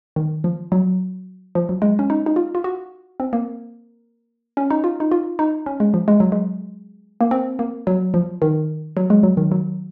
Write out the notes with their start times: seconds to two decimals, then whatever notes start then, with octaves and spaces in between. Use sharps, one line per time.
0.16 D#3
0.44 F3
0.72 F#3
1.55 F3
1.69 F#3
1.82 G#3
1.99 C#4
2.10 D#4
2.26 D#4
2.36 F4
2.55 F4
2.64 F#4
3.20 C4
3.33 A#3
4.57 C#4
4.70 D#4
4.84 F4
5.00 D#4
5.12 F4
5.39 D#4
5.66 C#4
5.80 G#3
5.94 F3
6.08 G#3
6.20 F#3
6.32 G#3
7.21 A#3
7.31 C4
7.59 A#3
7.87 F#3
8.14 F3
8.42 D#3
8.97 F#3
9.10 G#3
9.23 F#3
9.37 D#3
9.52 F#3